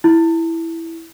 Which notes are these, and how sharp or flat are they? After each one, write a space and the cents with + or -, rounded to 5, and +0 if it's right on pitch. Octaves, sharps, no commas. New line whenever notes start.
E4 +0